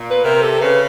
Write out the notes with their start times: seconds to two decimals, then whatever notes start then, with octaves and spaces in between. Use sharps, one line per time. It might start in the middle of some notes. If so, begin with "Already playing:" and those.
Already playing: A#2
0.11 B4
0.24 C3 A#4
0.42 A4
0.61 C#3 B4